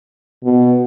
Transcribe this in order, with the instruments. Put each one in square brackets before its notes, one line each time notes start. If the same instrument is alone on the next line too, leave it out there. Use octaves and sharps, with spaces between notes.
[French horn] B2